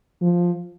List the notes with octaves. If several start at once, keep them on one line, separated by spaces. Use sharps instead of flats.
F3